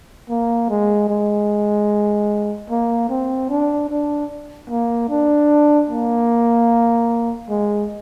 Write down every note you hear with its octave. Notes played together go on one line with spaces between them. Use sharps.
A#3
G#3
G#3
A#3
C4
D4
D4
A#3
D4
A#3
G#3